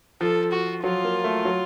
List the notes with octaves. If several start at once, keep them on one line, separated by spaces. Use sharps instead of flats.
F3 A4
F#4
F#3 F4
A#3
A3
F#3